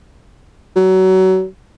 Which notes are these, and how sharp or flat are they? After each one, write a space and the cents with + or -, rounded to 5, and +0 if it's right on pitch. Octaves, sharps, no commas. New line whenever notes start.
F#3 +25